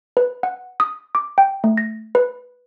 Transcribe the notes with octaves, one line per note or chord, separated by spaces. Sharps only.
B4
F#5
D#6
D6
G5
A3
A#6
B4